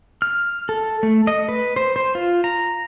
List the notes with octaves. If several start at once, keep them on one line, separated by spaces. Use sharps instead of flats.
F6
A4
A3
D#5
B4
C5
C5
F4
A#5